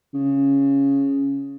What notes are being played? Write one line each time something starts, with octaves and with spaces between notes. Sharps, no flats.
C#3